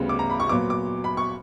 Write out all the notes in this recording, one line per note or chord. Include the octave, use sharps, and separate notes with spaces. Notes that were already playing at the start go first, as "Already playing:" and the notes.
Already playing: D2 C#3 G3 B3
D6
A#5
B5
C#6
A#2 F#3 B3 D6
D6
B5
C#6